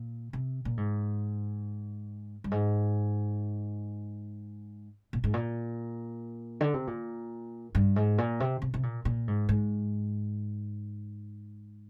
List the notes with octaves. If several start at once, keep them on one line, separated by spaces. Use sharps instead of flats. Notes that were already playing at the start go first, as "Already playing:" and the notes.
Already playing: A#2
C3
A#2
G#2
G2
G#2
A#2
G#2
A#2
D3
C3
A#2
G2
G#2
A#2
C3
C3
C3
A#2
A#2
G#2
G#2